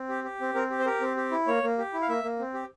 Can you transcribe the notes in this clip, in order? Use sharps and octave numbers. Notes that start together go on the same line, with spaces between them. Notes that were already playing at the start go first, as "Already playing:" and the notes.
Already playing: C4
G4
G4
C4
C4 A#4
G4
C5
G4 A#4
C4
G4
E4
A#3 C#5
A#3
G4
E4
F5
A#3 E5
A#3
C4
G4